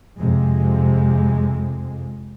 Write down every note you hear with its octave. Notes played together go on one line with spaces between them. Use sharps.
F2 C3 G#3